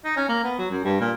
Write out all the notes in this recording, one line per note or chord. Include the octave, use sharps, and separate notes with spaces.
D#4
C#4
A#3
B3
F#3
F#2
G2
A#2